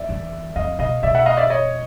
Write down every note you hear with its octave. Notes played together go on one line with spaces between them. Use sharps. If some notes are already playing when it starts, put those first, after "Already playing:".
Already playing: D5 E5
E2
F2 D#5 F5
B2 D#5 F5
B2 D5 E5
E5 F#5
D#5 F5
D5 E5
C#5 D#5